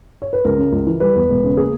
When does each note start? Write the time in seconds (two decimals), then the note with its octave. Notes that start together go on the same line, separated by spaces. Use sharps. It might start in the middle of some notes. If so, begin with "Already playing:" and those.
0.22 C#5
0.33 B4
0.45 C#2 A#4
0.58 C#3
0.72 C#2
0.87 E3
1.00 G3 B4
1.15 E2
1.29 E1
1.44 C#3
1.57 A#3 G#4